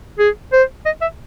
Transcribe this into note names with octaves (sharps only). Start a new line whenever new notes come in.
G#4
C5
D#5
E5